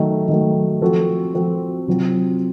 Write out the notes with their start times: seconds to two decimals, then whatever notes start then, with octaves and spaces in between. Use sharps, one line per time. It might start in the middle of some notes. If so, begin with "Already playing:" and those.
Already playing: D#3 F#3 A3
0.28 D#3 F#3 A3
0.81 F3 C4 F#4 A4
1.34 F3 C4 F#4 A4
1.87 C3 F#3 C4 F4